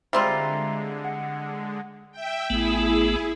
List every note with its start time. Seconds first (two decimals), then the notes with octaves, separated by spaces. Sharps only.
0.13 D3 G3 G#3 C4 F4 E5 A#5 C6
1.04 F#5
2.12 E5 G5
2.50 A1 A3 B3 E4 G#4